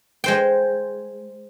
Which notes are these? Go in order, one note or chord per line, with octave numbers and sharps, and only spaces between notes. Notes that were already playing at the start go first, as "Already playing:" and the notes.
G#3 C5 G5